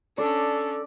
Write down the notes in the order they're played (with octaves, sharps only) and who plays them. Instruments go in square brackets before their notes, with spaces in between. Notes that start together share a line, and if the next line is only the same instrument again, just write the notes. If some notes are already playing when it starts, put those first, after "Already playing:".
[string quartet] C#4 D4 [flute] A4 [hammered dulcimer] D5